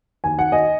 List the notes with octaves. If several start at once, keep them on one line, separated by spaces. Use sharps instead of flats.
D#2 G#5
F#5
D#5 G#5